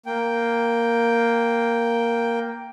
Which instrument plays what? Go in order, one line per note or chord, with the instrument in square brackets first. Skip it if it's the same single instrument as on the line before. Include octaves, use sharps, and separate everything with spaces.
[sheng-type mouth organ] A#3 G5